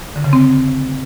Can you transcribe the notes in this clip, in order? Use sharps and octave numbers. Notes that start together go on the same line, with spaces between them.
D3
C#3
C4